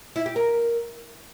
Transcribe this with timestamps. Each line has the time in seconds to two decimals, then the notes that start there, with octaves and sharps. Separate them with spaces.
0.16 E4
0.26 G4
0.36 A#4